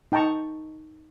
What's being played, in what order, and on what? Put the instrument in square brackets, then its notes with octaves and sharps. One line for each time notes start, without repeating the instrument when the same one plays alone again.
[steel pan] D#4 G5 A5 A#5 C#6